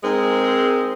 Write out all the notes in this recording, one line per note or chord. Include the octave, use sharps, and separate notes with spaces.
G#2 G#3 C4 A#4